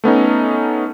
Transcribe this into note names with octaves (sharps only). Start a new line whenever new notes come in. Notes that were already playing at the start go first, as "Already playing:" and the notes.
A3 B3 C#4 D#4